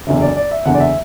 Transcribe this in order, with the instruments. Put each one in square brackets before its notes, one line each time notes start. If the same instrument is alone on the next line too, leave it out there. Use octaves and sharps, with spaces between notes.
[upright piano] F#1 E2 D3 E5
D5
D5
E5
F#1 E2 D3 F#5
D5
E5